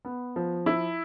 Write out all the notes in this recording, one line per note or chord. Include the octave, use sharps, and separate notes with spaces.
B3
F3
E4